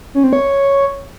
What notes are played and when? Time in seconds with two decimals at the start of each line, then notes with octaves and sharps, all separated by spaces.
0.15 C#4
0.24 C4
0.33 C#5